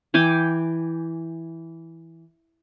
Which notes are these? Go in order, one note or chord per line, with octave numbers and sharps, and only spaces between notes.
E3 G5 G#5 D6